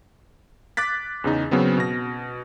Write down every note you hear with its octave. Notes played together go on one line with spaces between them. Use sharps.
D6 F#6 A6 B6
E2 C#3 D#4
C#3 F#3 B3 C4
B2 A#6